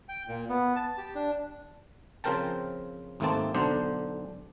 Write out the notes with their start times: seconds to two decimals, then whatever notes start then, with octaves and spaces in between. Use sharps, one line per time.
0.09 G5
0.28 A#2
0.49 B3
0.76 A5
0.98 G4
1.15 D4
2.24 C#3 F3 C4 A#4 G5 A5
3.20 G#1 D#2 A3 A#3 C4 A5
3.55 B1 D3 D4 C5